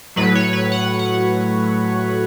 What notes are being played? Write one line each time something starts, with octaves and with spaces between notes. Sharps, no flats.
A2 F#3 B4
C#5
B4
F#5
F#5